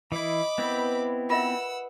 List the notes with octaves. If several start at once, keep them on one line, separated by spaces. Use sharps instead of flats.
E3 E4 D#5 B5 D6
B3 C4 E4 B4
F4 A#4 E5 F#5 E6